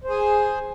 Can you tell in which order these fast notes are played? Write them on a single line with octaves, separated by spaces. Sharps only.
C5 G#4 G#5